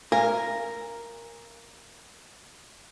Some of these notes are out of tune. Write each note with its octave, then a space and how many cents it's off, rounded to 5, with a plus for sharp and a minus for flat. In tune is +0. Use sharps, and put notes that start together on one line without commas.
A#4 +0 F5 -25 G#5 -20